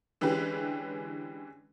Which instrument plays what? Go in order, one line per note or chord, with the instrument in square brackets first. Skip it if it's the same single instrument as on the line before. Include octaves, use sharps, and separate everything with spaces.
[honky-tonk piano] D3 E3 G#3 C#4 G4 B4